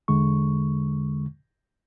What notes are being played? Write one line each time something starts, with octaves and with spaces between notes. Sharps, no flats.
E2 D3 G#3 C#6